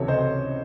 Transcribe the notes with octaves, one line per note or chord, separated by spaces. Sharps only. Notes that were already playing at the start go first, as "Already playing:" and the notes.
Already playing: C#2 C3 E3 F#4 A4 C#5
C5 D#5